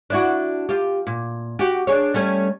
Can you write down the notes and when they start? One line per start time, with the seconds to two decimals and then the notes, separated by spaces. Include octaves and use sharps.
0.10 D4 E4 F#4
0.69 F4 G4
1.07 A#2
1.59 F#4 G4
1.87 D4 G#4 C#5
2.14 G3 A3 C#4